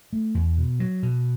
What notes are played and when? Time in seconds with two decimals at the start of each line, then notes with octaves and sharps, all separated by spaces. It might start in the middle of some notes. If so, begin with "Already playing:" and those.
0.13 A3
0.35 E2
0.58 B2
0.80 F#3
1.03 B2